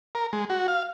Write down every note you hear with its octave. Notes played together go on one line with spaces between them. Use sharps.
A#4
G#3
F#4
F5